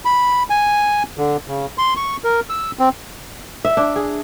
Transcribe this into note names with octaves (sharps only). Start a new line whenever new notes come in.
B5
G#5
D3
C#3
C6
C#6
A#4
E6
C4
E5
D4
G#4